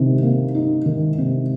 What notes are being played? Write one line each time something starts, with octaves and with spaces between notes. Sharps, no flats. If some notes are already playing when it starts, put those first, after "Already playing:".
Already playing: C3 D#3
A#3
D#4
D#3
C3